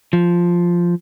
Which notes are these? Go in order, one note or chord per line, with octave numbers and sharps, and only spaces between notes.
F3